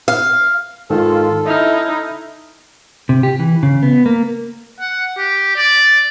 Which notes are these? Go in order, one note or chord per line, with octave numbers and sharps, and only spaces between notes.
F5
G#2 D#3 F4 A4
D#4 E4 E5 F6
C3
G4
E3
C#3
B3
A#3
F#5
G4
D5